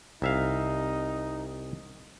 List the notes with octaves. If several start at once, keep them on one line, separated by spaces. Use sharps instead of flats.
C2 D#4 E5 F5